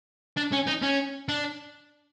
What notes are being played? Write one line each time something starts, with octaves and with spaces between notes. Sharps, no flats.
D4
C#4
D#4
C#4
D4